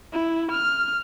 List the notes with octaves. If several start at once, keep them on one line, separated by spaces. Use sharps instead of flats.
E4
F6